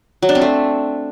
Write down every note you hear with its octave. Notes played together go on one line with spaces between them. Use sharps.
F#3
D4
C4
A3